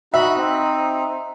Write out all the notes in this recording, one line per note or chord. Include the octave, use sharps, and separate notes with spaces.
D#4 F#4 E5 B5 F#6
C4